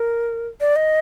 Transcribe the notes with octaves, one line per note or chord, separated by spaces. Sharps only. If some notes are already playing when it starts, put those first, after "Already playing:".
Already playing: A#4
D5
D#5